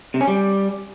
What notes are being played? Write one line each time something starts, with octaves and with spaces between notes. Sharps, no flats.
C3
C#4
G3